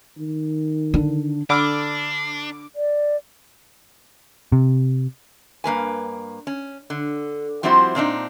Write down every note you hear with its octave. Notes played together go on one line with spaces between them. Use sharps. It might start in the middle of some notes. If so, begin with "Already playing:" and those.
D#3
D3 D4
D3 D4 B5 D6 E6 F6
D5
C3
G2 A#3 B4 G#5
C#4
D3
F3 G3 C4 E4 F#4 C5
A#2 C4 D4 D#4